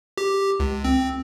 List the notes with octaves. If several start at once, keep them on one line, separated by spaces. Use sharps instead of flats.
G4
C#2
C4